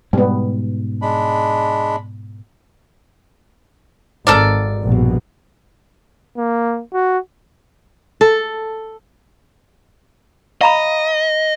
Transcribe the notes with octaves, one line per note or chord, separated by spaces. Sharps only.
G#2 B2 G3 B3
G#3 D4 B5
G#1 A4 A#4 D5
A#1 G2 B2
A#3
F#4
A4
D#5 F5 A#5 B5